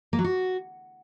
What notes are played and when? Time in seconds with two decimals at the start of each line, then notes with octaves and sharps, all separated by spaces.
0.13 A#3
0.19 F#3
0.24 F#4